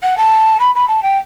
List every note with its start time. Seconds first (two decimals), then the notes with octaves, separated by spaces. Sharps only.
0.03 F#5
0.17 A5
0.59 B5
0.75 B5
0.88 A5
1.02 G5